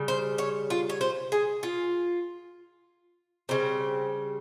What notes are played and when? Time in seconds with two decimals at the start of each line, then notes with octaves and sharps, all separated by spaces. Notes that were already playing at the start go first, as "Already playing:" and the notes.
Already playing: C#3 G3
0.08 C5
0.38 C#5
0.70 F4
0.89 C#5
1.01 C5
1.32 G#4
1.63 F4
3.49 C#3 G3 C4